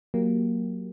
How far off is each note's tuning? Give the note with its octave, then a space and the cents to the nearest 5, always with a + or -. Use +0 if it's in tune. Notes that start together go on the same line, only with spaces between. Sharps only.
F#3 +0 A#3 +0 G4 +0